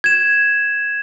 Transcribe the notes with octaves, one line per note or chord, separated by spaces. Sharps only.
G#6 E7